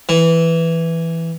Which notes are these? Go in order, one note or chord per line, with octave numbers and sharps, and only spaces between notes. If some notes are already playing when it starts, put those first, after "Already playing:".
E3